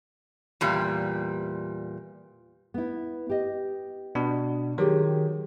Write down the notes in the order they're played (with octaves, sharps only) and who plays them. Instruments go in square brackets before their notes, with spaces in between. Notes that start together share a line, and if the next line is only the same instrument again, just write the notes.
[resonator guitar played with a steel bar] E2 A#2 G3
[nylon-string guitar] B3 E4
G4 D#5
[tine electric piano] B2 D4
[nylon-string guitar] D#3 G4 G#4 [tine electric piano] F#3